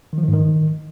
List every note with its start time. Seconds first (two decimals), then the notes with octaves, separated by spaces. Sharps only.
0.13 D#3
0.18 F3
0.23 D#3
0.28 G#2
0.33 D#3